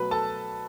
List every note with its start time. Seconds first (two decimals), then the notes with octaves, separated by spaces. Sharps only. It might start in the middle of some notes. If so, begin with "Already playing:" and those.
Already playing: B2 F#3 A3 B4 B5
0.11 A4 A5